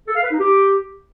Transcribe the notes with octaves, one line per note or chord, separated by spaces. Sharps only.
A4
F5
B4
D#4
G4